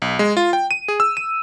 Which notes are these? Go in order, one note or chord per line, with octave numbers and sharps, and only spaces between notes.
B1
G#3
F4
G5
D#7
G#4
E6
D#7